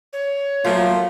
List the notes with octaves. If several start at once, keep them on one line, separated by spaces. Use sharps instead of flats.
C#5
F3 F#3 A3 A#3 F4